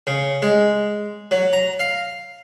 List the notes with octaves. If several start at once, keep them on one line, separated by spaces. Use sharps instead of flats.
C#3
G#3
F#3
A#5
F5